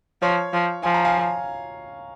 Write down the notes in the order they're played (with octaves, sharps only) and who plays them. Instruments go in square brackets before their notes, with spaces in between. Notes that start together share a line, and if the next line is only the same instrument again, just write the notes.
[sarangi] F3 [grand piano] C#5
[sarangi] F3
[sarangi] F3 [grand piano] G#5
[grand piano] A#5
F5 G#5